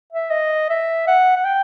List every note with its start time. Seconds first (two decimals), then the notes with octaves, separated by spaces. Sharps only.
0.12 E5
0.31 D#5
0.69 E5
1.07 F#5
1.36 F#5
1.44 G5